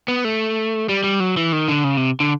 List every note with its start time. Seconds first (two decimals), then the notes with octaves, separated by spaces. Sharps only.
0.08 B3
0.25 A3
0.89 G3
1.04 G3
1.20 F#3
1.37 E3
1.52 D#3
1.68 D3
1.84 C#3
1.97 C3
2.20 D3